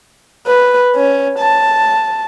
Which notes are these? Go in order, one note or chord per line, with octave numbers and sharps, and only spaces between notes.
B4
C#4
A5